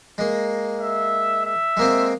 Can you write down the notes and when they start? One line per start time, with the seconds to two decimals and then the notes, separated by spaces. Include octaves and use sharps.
0.18 G#3 A#3
0.80 E5
1.45 E5
1.77 G#3 A#3 C4